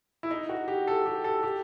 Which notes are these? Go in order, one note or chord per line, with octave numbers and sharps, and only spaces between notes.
E4
D#4
F#4
G4
A4
G4
A4
G4